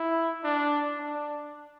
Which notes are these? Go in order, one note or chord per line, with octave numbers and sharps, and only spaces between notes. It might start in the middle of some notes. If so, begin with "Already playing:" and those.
Already playing: E4
D4
D4